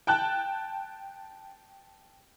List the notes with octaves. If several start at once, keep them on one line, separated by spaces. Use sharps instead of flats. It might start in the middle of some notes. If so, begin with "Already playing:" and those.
G5 A5 F#6